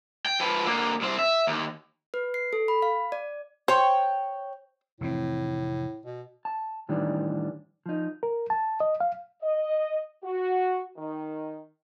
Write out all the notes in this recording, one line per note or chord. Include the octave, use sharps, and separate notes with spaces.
G5
F3 B4
D3 A#3
C2 C4
E5
D#2
B4
C7
A4
B5
F5
D5
C5 C#5 G5
F1 A2 E3 C4
B2
A5
A2 D#3 E3 G3 D4
F3 D#4
A#4
A5
D#5
F5
D#5
F#4
D#3